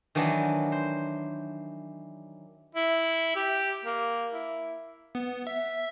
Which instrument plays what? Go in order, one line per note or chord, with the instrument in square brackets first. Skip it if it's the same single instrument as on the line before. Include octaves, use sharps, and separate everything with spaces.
[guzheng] D#3 E3 F#3 D4
C5
[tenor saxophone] E4
G4
A#3
E4
[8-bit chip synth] B3
E5